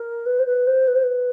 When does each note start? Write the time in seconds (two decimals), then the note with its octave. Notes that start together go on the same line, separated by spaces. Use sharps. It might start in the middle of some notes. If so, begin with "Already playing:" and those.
Already playing: A#4
0.26 B4
0.39 C5
0.47 B4
0.67 C5
0.88 B4
0.96 C5
1.03 B4